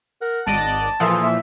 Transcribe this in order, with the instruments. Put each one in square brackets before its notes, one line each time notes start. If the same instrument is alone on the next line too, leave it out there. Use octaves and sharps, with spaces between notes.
[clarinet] A#4 [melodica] F#5
[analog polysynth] G#1 D5 D#5 [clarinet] A5
[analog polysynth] A#2 E3 F3 [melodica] F4 G#4 A4
[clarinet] E5